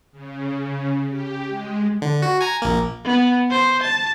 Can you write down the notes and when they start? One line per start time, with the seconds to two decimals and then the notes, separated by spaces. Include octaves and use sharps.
0.12 C#3
0.52 C#3
1.10 G4
1.48 G#3
2.02 D3
2.22 F#4
2.41 G#5 A#5
2.62 A#1 A#3
3.05 B3
3.51 C5
3.82 A5